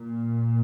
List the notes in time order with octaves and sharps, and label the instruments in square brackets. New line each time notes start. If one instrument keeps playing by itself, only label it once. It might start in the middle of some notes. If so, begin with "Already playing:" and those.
Already playing: [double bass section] A#2